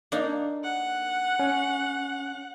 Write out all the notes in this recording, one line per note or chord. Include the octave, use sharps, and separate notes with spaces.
A#3 D4 D#4
F#5
C#4